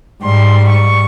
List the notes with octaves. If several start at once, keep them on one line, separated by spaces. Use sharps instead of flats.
G#2 G3 C6
C#6